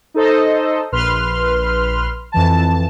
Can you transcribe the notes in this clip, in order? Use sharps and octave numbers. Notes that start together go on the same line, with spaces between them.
D#4 A4 C5 D#5
A#1 B4 C6 F6
F2 E3 A5